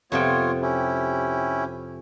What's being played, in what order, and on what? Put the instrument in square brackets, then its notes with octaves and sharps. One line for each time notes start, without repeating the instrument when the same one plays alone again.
[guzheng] F2 C3 G5 [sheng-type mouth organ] B3 F4 C#5
[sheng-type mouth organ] C#4 E4 G4